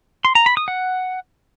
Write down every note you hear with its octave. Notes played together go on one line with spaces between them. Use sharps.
C6
A#5
B5
D#6
F#5